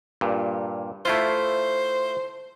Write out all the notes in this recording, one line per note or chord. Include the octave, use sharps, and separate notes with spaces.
G2 A#2
A3 E4 F4 C5